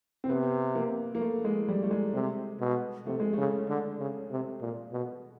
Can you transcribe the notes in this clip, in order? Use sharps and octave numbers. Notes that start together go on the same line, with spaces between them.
C4
C3 B3
A#3
A#3
A3
G#3
G3
A3
G#3
C3
B2
C3 A3
G#3
A3
C#3
D3
C#3
C3
A#2
B2